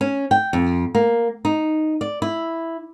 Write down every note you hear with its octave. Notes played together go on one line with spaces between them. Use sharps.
C#4
G5
F2
A#3
D#4
D5
E4